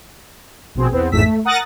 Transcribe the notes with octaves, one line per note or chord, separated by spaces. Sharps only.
A#1 B2 C4 G#4
E2 B3 C4
A1 F2 G#2 A3 E6 B6
A3
A#4 F#5 D#6 F#6 A6 A#6